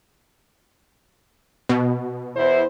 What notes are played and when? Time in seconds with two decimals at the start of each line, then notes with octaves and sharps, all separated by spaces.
1.69 B2
2.36 E2 E4 C5